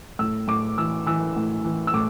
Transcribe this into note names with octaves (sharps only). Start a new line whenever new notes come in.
A2 E6
A2 D6
E3 E6
E3 E6
A2
E3
E6
A2 D6